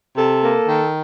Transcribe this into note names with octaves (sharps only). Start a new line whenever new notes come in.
C3 A4
A#3
D#3